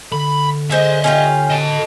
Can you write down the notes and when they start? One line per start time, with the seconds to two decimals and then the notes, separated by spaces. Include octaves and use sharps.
0.12 D3 B5
0.71 G#3 C5 D#5 E5
1.04 C#4 F4 G4
1.50 D#5 A5